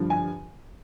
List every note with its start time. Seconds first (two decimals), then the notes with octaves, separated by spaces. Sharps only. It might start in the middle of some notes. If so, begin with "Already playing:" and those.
Already playing: G2 D3 F3
0.10 G#5